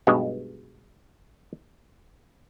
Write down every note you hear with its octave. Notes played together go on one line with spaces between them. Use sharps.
B1 G2 B2 G#3